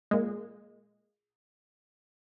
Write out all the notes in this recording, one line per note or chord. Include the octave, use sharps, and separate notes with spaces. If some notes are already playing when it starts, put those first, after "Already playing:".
A#2 G#3